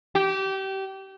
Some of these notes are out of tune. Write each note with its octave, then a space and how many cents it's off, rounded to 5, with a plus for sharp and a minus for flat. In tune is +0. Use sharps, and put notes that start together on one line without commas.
G4 -25